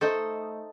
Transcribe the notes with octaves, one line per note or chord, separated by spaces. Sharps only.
A3 D#4 A4 C5